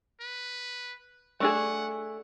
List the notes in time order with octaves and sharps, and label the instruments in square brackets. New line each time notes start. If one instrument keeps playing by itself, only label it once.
[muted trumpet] B4
[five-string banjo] A3 D4 G#4 [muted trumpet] F#5